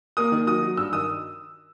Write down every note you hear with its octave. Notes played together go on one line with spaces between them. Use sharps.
A#3 D#6
D#3
F#3 D#6
F#3
G2 E6
D#3 D#6